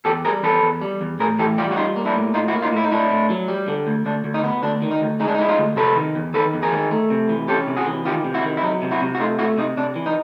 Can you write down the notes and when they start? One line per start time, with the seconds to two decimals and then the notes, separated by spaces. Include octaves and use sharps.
0.05 E2 G4 A4
0.25 G3 G#4 A#4
0.43 E2 A4 B4
0.62 E2
0.81 G3
1.01 E2
1.20 A2 G#4 A#4
1.39 E3 G4 A4
1.58 G3 F4 G4
1.71 F#4
1.76 G3 D#4 F4
1.96 A#3
2.05 D4 E4
2.16 A2
2.34 A2 D#4 F4
2.48 E4 F#4
2.53 A#3
2.62 D#4 F4
2.73 A2 E4
2.84 D#4
2.91 A2 D4 E4
3.10 A2
3.30 F#3
3.48 G3
3.68 D3
3.87 D2
4.06 D2 D4
4.24 D2
4.34 D#4
4.44 B3
4.63 D2 D4
4.82 D#3
4.91 D#4
5.01 D2
5.20 G#3 D#4
5.28 D4
5.35 D#4
5.39 G#3 E4
5.48 D#4 F4
5.58 D2
5.76 C3 A4 B4
5.96 D#3
6.15 E2
6.34 D#3 A4 B4
6.54 E2
6.63 G#4 A#4
6.72 D#3
6.91 A3
7.10 C3
7.29 E3
7.48 C#4 G4 A4
7.68 C3
7.76 F#4 G#4
7.86 E3
8.05 D#3 F4 G4
8.24 C3
8.34 E4 F#4
8.44 D#3
8.57 E4
8.63 F#3 D#4
8.82 C3
8.91 E4 F#4
9.01 C3
9.15 F#4
9.20 A3 D#4 F4
9.39 A3 E4 F#4
9.58 C3 D#4
9.77 C3 D4
9.96 E3
10.06 D#4